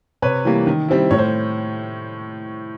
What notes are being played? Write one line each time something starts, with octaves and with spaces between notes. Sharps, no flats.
C3 B4 C#5
E3 G3 A#3
D#3
G3 C4 E4
A2 C#5
C5